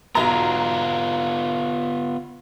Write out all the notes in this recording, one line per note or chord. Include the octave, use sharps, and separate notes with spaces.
B1 B3 F4 A#5